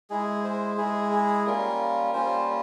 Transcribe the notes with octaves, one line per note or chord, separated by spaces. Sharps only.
G#3 E4 G#4
C5
G#3 E4 G#4
G#4
G3 A#3 C#4 F4 A#4
G3 A#3 C#4 F4 C5